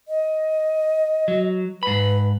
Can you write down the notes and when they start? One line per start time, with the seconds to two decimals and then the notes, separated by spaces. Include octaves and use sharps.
0.08 D#5
1.28 F#3
1.83 G#2 B4 B5